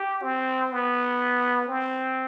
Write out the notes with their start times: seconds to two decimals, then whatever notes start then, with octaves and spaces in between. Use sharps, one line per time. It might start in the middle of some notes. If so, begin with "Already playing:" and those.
Already playing: G4
0.23 C4
0.72 B3
1.67 C4